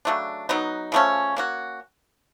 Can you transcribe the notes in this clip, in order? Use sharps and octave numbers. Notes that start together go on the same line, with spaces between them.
C#3 F#3 A3 D4
F#3 B3 D#4
C#3 F3 A3 C#4
A#3 C#4 F#4